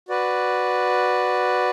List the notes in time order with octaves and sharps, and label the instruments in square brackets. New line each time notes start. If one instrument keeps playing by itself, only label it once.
[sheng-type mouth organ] F#4 B4 D5